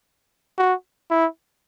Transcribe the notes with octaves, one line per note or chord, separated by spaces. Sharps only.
F#4
E4